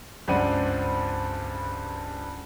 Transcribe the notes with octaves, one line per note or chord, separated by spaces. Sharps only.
C#2 G2 C4 D5 F#5 D#7